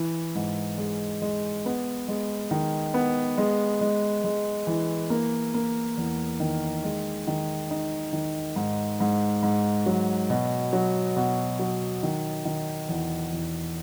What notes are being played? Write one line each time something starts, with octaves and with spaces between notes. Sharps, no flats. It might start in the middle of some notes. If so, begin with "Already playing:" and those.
Already playing: E3
G#2
G#3
G#3
B3
G#3
D#3
B3
G#3
G#3
G#3
E3
A#3
A#3
E2
D#3
G#3
D#3
D#4
D#3
G#2
G#2
G#2
F#3
B2
F#3
B2
F#3
D#3
D#3
E2
E2